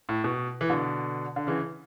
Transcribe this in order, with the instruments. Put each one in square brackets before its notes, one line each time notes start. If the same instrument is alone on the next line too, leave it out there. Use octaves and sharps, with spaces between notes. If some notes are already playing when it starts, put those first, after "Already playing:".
[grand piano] A2
B2
E3
B2 D3
D3
C#3 E3